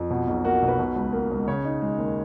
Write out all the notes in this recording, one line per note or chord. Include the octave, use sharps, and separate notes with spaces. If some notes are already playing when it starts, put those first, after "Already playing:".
Already playing: F2
B2
B1
A#3 F#4
B1
B4
B2
C#2
A#3
C#2
C#3 C#5
D#4
G#3
D#2